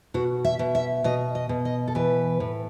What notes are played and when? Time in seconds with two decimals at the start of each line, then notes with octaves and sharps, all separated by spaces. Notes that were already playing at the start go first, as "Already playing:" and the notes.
0.14 B2 F#4
0.44 E5
0.59 B2
0.75 E5
1.04 B2 D#5
1.35 D#5
1.49 B2
1.65 D#5
1.88 A4
1.95 E3 B4
2.40 A2